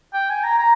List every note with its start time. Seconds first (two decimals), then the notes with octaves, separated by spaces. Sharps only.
0.14 G5
0.30 G#5
0.44 A#5
0.59 A#5